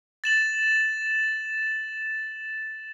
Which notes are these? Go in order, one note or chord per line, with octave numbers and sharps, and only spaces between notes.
A6 E7 F#7